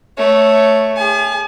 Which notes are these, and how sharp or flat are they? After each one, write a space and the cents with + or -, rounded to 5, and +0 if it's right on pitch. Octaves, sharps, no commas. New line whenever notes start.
A3 +0 C#5 +0
G#4 -35 G#5 +45